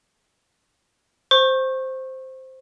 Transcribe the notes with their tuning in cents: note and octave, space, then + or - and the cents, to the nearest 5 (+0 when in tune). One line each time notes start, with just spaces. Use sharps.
C5 +0 C#6 -25